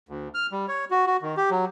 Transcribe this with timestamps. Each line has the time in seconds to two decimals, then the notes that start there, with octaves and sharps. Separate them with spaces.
0.09 D2
0.34 F6
0.52 G3
0.68 C#5
0.91 F#4
1.07 F#4
1.22 D#3
1.37 G4
1.51 F#3